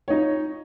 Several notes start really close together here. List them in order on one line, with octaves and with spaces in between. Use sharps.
C#5 D#4 F4